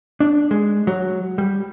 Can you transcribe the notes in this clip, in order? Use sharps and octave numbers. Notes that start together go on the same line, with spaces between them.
D4
G#3
F#3
G3